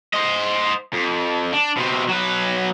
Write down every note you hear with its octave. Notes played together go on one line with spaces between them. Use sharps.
C5 D#5
F2
D4
B2 C4
F#3 B4